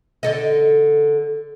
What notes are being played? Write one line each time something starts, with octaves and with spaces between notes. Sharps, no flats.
D3 A4 D#5